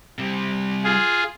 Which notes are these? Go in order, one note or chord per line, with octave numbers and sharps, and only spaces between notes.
C3 G3
F4 G#4